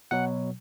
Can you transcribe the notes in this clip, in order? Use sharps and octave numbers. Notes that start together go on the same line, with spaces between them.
B2 F#3 F#5